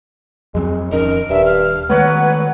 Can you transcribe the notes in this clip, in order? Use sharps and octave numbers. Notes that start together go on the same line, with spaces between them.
F2 F#3 G#3 C4
D#1 F2 C#4 D#4 A#4
D#1 G2 E5
F6
D#3 F#3 G#3 A3 B3 B4 C#5 F#5